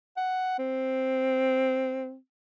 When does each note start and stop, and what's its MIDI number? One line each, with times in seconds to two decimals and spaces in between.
0.17 0.57 78
0.59 2.16 60